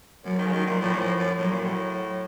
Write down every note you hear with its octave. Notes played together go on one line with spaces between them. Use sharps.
F#2 F#3
D#3
C#3
D#3 F#3
A#2
A2 F3
A#2
A2
F#2
A2 F#3
A#2
A2